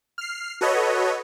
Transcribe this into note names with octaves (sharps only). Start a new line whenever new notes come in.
F6 C7
F#4 A4 B4 C#5 D#5